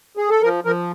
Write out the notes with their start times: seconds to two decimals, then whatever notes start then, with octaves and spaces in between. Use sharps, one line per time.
0.17 G#4
0.30 A4
0.42 F3 A#4
0.64 F3 A#4